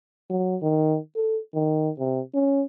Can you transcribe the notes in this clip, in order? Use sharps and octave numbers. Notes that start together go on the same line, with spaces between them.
F#3
D#3
A4
D#3
C3
C#4